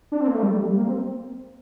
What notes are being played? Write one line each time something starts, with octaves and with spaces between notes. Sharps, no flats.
D4
C4
A#3
A3
G3
G3
A#3
C4